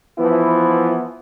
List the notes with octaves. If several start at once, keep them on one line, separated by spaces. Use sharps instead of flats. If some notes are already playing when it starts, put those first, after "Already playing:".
E3 F3 B3 E4